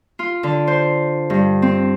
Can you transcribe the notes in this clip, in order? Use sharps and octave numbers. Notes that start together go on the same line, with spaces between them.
F4
D3
C5
G2
C4